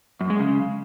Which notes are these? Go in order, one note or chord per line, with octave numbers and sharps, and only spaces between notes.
F#2
G#3
C#3